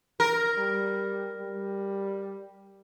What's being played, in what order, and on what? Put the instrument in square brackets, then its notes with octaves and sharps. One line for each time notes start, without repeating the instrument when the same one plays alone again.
[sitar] A#4
[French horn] G3
G3